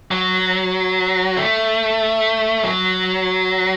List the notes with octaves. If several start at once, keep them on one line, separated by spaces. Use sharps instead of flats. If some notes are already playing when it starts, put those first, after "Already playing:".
F#3
A3
F#3